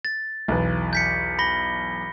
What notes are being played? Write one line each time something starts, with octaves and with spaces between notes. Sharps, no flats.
A6
B1 E2 B4
G6 B6 C#7
B5 A#6 G7